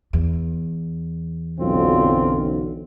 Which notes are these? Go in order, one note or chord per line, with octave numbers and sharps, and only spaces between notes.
E2
B1 F#2 D3 C4 F4